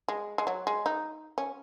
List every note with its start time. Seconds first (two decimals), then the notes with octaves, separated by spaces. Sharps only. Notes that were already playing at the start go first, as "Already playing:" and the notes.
0.08 G#3
0.38 G#3
0.47 F#3
0.67 G#3
0.86 D#4
1.38 C#4